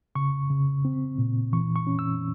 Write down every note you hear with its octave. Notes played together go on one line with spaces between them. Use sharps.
C#3 C#6
C#3
C4
A#2
E3 C#6
C#6
C#4
E6